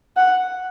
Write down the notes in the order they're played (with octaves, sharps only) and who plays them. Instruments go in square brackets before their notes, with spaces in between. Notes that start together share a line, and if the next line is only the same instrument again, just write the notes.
[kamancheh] F#5